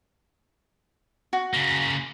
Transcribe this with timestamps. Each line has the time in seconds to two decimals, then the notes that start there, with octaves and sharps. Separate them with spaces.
1.33 F#4
1.53 C#3 A#3